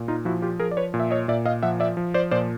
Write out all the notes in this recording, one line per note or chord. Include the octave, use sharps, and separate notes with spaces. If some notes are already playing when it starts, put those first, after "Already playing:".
Already playing: A#2
D#4 F4
F3 E4 F#4
F4 G4
F3 G#4 A#4
D5
B4 C#5
A#2
E5
C#5 D#5
A#2 D5 E5
D#5 F5
F3 E5 F#5
D5 E5
F3
C5 D5
A#2 C5 D5